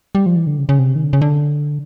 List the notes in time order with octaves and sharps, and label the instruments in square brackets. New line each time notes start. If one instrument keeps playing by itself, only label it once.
[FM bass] G3
F3
E3
D3
C#3
C#3
C3
D#3
D3
C#3
D3